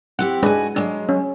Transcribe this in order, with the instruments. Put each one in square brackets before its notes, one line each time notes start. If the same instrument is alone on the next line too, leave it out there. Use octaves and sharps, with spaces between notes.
[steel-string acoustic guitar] C4 E4 G4 [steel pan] F#5
[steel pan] G#3 D4 B4 [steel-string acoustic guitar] F#4 G#5
[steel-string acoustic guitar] F#3 G#3 [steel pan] D4
[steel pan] C#4